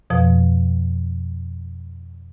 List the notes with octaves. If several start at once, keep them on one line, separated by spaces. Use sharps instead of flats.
F2 B2 F3